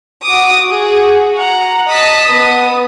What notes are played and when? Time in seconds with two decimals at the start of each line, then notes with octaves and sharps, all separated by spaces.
0.24 F#4 D6 D#6
0.69 F#4 G#4
1.38 F#5 A#5
1.88 D#5 A5 D#6 B6
2.30 B3